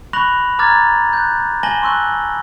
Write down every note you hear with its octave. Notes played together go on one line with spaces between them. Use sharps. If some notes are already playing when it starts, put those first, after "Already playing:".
B5 C#6 F#6 A#6 F7 F#7
A#5 D6 F6 G#6 A6
F#6 G6
G#5 A5 A#6 F#7 G7
C6 C#6 E6 F#6